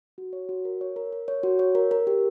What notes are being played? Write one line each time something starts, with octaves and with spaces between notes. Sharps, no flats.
F#4
C#5
F#4
A#4
C#5
A#4
A#4
C#5
F#4
C#5
A#4
A#4
G4